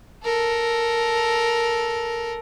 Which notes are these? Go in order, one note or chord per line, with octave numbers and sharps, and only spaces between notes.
A4 A#4